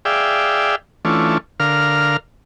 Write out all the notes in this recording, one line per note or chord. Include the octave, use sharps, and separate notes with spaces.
G#4 D5 E5 F5 G5
E3 A3 C#4 D4 F4
D3 A#4 F5 F6